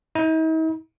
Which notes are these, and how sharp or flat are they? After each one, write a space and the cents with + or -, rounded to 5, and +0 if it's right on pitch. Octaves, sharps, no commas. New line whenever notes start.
D#4 +45